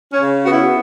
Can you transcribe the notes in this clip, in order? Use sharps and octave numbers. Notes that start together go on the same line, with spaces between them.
C#4
C#3
B3 F#4
E4